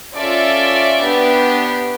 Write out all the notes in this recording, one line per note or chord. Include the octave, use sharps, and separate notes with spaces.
C#4 F4 A4 D5 E5
B3 D4 G4